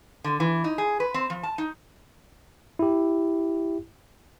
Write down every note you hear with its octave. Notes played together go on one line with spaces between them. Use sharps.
D3
E3
D#4
G#4
B4
C4
F3
A5
D#4
E4 G4